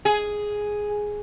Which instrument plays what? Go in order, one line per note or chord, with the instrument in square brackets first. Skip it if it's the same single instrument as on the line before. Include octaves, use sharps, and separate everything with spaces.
[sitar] G#4